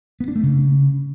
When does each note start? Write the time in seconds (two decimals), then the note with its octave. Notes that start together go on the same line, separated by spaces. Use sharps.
0.20 B3
0.28 D4
0.36 A3
0.43 C#3